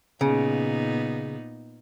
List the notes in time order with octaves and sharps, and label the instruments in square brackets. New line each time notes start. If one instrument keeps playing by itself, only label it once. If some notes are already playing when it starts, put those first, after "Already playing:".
[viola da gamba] A#2 B3 D#4 [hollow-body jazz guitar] C#3